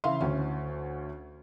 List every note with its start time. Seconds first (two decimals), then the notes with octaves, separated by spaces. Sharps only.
0.04 C#3 E3 E5 F5 C6
0.21 D2 C#4